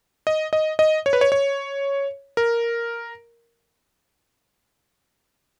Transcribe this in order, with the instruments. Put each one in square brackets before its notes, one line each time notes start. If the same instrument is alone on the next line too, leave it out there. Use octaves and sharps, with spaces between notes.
[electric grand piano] D#5
D#5
D#5
C#5
B4
C#5
C#5
A#4